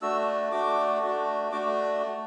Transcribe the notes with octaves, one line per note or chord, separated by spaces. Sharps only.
A3 D4 F#4 E6
A3 D4 F#4 D6
A3 D4 F#4
A3 D4 F#4 D6